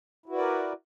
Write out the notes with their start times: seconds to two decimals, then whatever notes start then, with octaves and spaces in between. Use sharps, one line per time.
0.26 E4
0.29 F#4
0.32 B4
0.35 D5
0.38 A#4